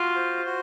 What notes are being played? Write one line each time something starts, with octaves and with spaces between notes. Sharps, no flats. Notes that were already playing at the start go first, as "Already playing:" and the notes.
Already playing: F4 F#4
C5
F#4